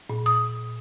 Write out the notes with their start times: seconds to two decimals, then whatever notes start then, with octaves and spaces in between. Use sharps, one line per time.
0.10 A#2
0.26 D#6